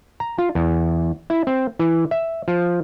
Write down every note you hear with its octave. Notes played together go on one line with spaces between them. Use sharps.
A#5
F4
E2
E4
C4
E3
E5
F3